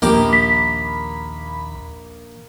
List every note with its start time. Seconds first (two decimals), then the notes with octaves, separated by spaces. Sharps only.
0.02 A#1 D#2 A#3 G4 B5 D6
0.33 B6